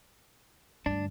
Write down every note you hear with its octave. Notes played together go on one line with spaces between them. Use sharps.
D2 G2 D4